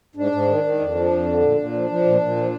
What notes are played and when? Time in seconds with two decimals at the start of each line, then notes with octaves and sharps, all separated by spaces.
0.16 G#2 D4
0.32 G#2
0.47 D#3
0.64 D#3
0.80 F2
0.95 F3
1.11 F2
1.26 D3
1.42 A#2
1.58 A#2
1.73 F3
1.89 F3
2.05 A#2
2.21 A#2
2.36 F3